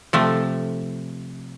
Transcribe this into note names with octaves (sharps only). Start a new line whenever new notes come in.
C3 F3 A3